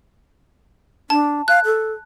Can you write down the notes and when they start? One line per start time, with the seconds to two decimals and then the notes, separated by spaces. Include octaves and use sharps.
1.10 D4 A5
1.48 F5 F#6
1.65 A4